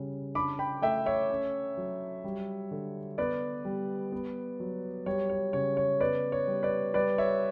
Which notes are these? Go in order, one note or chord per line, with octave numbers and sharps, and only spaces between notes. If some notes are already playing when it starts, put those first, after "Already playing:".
Already playing: C#3 G3
D4 B5 D6
G5 B5
A3 E5 G5
C#5 E5
C#4
F#3
G3
D3
B3 B4 D5
G3
B3
F#3
G3 C#5
C#5
C#3 C#5
C#5
B3 B4 D5
C#5
G3
B4 D5
G3 B4 D5
C#5 E5